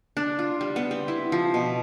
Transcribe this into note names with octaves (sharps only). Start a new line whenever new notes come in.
D4
F4
G3
B3
C4
E4
F3
B2